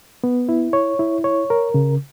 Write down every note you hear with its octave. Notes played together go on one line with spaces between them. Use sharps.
B3
E4
C#5
E4
C#5
A#4
C#3